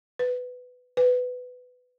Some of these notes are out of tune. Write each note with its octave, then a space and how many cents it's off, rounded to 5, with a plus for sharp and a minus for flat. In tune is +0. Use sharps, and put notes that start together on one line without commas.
B4 +10
B4 +15